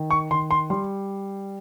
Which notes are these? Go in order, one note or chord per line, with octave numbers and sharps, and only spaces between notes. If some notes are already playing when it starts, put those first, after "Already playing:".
Already playing: D#3
C#6
D#3 C6
C6
G3 C6